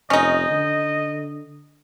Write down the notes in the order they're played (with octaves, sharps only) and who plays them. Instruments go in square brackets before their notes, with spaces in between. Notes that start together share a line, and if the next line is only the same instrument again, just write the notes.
[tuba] F1 [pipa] C#4 D#4 [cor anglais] D#5
[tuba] D3